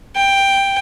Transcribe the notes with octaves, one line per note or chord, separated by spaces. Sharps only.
G5